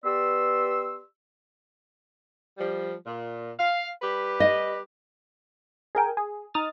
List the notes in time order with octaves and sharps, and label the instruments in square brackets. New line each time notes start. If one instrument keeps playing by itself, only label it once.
[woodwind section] B3 G4 B4 D5 C6 E6
[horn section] F3 G3
A#2
F5
G3 G4 B4
[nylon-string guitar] D#5
[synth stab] G#4 A#4 G5 G#5
G#4
D#4 D#6 F6 A6